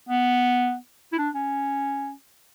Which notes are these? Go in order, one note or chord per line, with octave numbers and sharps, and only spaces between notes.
B3
E4
D4
C#4